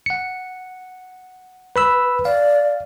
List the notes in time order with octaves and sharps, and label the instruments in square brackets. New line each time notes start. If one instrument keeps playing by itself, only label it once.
[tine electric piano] F#5 C#7
B4 B5 E6
[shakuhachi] D5 [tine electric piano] F5